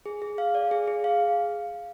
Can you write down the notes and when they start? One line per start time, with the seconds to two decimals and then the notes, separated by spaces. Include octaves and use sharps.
0.06 G#4
0.22 G#4
0.38 F5
0.55 D5
0.71 G#4
0.87 G#4
1.04 F5